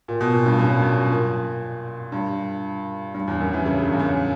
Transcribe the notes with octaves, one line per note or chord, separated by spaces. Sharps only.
A#2
B2
A#2
G2
F#2
G2
F#2
A#2
G2
G2
E2
F#2
E3
C#3
G2
E2
F#2